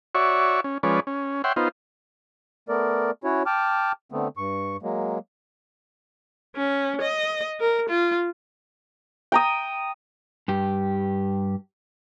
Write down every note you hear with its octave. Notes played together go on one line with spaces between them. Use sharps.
F#4 C#5 D5 E5 C#6
C#4
F3 G#3 C#4 B4 C#5 D5
C#4
C#5 E5 F#5 G5 C6
B3 D#4 F4 C5
A3 B3 A#4 D5
C#4 E4 F#4 C#5
G5 A5 D6 F6
D3 A3 B3 C4
G2 C#6
F#3 G#3 A#3
C#4
D#5
A#4
F4
G5 A#5 D#6
G2 G4